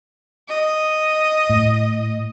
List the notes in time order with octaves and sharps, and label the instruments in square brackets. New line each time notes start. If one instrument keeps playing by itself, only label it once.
[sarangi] D#5
[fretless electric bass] A2